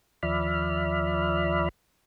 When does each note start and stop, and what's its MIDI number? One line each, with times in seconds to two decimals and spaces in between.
0.23 1.69 39
0.23 1.69 53
0.23 1.69 74
0.23 1.69 76
0.23 1.69 83
0.23 1.69 89